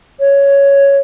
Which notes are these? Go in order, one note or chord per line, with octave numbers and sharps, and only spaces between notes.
C#5